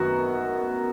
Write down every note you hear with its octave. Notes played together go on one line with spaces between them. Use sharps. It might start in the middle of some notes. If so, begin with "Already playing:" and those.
Already playing: F#2 D#3 B3 F#4